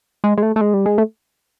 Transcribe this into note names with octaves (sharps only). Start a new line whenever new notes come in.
G#3
G#3
A3
A3
G#3
G3
G#3
A3